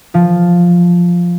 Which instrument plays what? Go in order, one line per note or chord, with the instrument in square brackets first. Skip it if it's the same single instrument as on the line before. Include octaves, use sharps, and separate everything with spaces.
[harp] F3